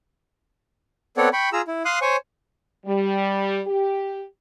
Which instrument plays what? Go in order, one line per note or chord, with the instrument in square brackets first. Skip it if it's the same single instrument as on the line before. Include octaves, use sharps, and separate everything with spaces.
[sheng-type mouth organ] B3 C4 A4 C#5 D5 F#5
G5 B5 C#6
F4 G#4 A#5 E6
E4
F5 C6 D#6 F#6
C5 C#5 G#5 C#6
[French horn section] G3
G4